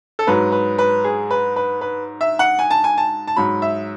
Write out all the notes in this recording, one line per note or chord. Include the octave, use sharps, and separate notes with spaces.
A4
G#2 F#3 B4
B4
B4
G#4
B4
B4
B4
E5
F#5
G#5
A5
G#5
A5
A5
G#2 F#3 B5
E5